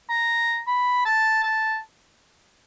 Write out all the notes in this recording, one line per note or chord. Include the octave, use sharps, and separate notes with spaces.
A#5
B5
A5
A5